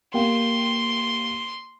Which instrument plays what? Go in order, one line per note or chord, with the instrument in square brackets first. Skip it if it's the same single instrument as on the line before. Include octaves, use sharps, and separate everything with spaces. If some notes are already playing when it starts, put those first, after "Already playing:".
[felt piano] A#3 G4 G5 [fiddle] C6